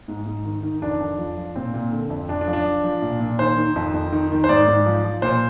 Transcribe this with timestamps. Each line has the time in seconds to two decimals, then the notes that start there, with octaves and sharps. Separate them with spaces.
0.08 G#2
0.26 G#2
0.45 D#3
0.63 D#3
0.82 F2 D4
1.00 F2
1.18 F3
1.37 F3
1.56 A#2 C4
1.74 A#2
1.92 D3
2.10 F2
2.28 F2 D4
2.41 D4
2.48 F3
2.53 D4
2.65 F3
2.84 F3
3.02 A#2
3.20 A#2
3.39 D#3 C5
3.57 D#3
3.76 F2
3.94 F2
4.12 D#3
4.31 D#3
4.44 C5
4.49 G#2 D5
4.67 G#2
4.86 F3
5.04 F3
5.22 A#2 C5